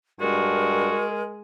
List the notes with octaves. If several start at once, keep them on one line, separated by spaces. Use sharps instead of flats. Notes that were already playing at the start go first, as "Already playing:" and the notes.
G2 G#3 F#4 A#4